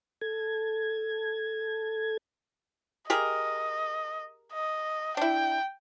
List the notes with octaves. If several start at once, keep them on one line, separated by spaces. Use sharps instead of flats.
A4 G#6
G4 G#4 A#4 D#5
D#5
D4 E4 G5